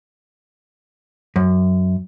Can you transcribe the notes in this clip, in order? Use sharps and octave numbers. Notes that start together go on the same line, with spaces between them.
F#2